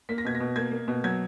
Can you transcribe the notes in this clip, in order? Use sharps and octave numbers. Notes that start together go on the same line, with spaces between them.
A#3 B6
A#6
B2 G#6
A#6
B2
A#3 G#6
A#3
B2
F#3 G#6